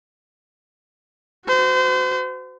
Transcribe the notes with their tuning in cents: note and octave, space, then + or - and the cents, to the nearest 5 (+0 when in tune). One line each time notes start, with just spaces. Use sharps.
F#4 +0 C5 -35